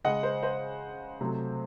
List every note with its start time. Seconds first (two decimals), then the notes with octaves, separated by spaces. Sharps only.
0.05 C#3 G#3 D#5 F#5
0.23 C5
0.43 C5 D#5
1.21 C3 F#3 A3